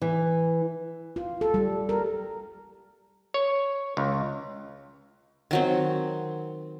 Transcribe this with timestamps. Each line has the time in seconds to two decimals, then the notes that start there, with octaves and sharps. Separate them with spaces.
0.02 E3
1.16 F4
1.41 A4
1.54 G3
1.89 A#4
3.34 C#5
3.97 C#2
5.51 D#3 F#3 C4